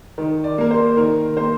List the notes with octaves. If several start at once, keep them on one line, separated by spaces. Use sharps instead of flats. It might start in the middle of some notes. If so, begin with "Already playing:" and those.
D#3
D5
A#3 A#4
C5
D#3 A#4
A#3 C5